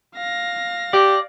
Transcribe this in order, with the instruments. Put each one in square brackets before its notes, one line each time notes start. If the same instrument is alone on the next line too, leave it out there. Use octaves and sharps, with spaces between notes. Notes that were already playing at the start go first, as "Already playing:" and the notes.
[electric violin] F5 A#6
[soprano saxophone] G4 [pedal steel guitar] D5